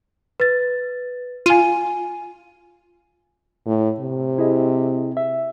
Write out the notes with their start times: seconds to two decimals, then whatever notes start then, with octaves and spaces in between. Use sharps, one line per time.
0.40 B4 A6
1.46 F4 G#5 D#7
3.66 A2
4.00 C3
4.38 E4 G#4 D#5
5.17 E5